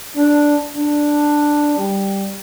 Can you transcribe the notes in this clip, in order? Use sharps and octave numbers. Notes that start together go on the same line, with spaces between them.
D4
D4
G3